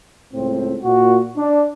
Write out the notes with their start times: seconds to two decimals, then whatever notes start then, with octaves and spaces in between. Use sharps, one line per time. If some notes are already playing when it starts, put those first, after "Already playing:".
0.34 C#2 A2 C4
0.83 A#2 F#4
1.37 D4